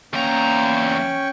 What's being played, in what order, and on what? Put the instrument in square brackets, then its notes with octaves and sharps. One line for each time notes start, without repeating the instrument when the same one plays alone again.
[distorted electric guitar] E2 A#5 [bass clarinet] A#3 [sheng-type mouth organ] C#4 G5 C#6